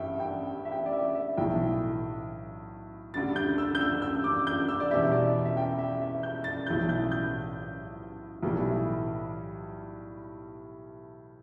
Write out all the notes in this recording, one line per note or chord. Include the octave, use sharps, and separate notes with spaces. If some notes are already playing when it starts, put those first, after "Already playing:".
Already playing: A1 G2 G3 E5 G5
G5
E5
G5
D5
E5
E5
B1 A2 E3 G5
D2 D3 G3 A6
G6
E6
G6
E6
E6
D6
G6
E6
D5
E2 B2 G3 E5
D5
E5
G5
E5
E5
G6
A6
B1 A2 E3 G6
G6
G6
B1 A2 E3 G3